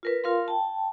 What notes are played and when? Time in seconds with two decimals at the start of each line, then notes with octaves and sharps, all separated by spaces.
0.03 F4 A#4 B4
0.24 F4 A#4 F5 C6
0.48 G5 A5